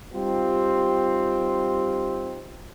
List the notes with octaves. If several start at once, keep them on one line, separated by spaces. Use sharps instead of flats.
G3 C4 D#4 F4 G4